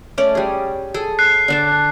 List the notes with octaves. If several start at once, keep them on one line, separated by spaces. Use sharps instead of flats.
A3 C#4 D5
G3 G#4
G#4 A4
F#6 C7
D3 D4 A5